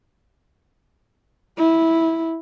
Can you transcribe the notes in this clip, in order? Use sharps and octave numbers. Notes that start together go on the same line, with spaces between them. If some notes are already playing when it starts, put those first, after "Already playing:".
E4